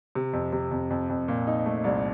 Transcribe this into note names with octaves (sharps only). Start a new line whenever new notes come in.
C3
F2
C3
F2
F2
F2
A#2
D#4
A3
C2